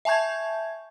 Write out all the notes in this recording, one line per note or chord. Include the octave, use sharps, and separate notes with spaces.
E5 G#5 A5 C#6 G6 G#6